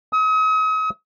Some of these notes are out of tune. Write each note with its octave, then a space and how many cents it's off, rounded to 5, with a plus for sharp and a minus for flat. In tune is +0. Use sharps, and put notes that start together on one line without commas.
D#6 +40